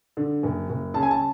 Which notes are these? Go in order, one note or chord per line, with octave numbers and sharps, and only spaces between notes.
D3
F#1
F#1
C#3 A5
G#5
A5